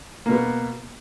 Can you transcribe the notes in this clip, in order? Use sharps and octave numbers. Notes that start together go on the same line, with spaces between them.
B2 A#3 B3